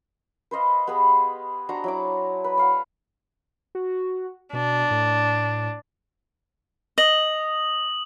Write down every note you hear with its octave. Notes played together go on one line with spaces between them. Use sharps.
B4 C5 D#5 F5
B3 G4 G#4 B4
D4 F#4 C5 A#5
F#3 E4 D6
B4
D5 F5 F#5
F#4
B2 D4
A2
D#5 D#6 F#7